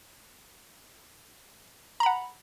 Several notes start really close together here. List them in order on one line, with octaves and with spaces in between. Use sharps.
A#5 B5 F#5